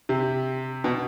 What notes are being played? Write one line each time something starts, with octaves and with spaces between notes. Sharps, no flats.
C3
B2